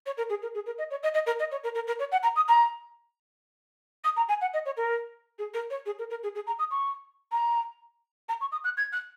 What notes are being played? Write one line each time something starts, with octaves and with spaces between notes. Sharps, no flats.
C#5
A#4
G#4
A#4
G#4
A#4
D#5
C#5
D#5
D#5
A#4
D#5
C#5
A#4
A#4
A#4
C#5
F#5
A#5
D#6
A#5
D#6
A#5
G#5
F#5
D#5
C#5
A#4
G#4
A#4
C#5
G#4
A#4
A#4
G#4
G#4
A#5
D#6
C#6
A#5
A#5
C#6
D#6
F#6
G#6
F#6